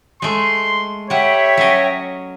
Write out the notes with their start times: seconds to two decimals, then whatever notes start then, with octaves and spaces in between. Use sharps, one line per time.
0.22 G#3 A3 C6
1.10 G3 C#5 E5 F#5 G5
1.57 F#3 C#4 D#5